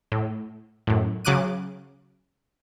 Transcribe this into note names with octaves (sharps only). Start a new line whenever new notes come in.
A2
F#2 A2
C#3 F#3 D6 F#6 D#7